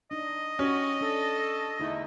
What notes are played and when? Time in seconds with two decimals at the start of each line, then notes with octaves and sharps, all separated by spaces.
0.11 D4 D#4 D#5
0.59 C#4 F#4 G4
1.01 D4 A4
1.80 E2 D3 A3 D#4 E4